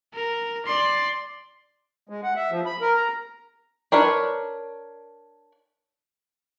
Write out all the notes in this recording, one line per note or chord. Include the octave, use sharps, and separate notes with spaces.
A#4
D5 C6
G#3
F#5
E5
F3
B5
A#4
A#5
D4 A#4 B4 C#5